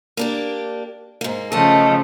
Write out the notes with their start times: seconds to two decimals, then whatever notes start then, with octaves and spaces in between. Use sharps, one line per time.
0.17 A#3 D4 G4
1.21 G#2 A#3
1.52 C#3 F3 A3 D#5 A5